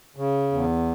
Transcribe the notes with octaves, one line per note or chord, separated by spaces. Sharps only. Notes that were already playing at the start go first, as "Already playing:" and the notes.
C#3
E2